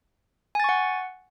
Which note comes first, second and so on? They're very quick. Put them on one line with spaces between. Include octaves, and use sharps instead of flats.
G#5 A6 C#6 F#5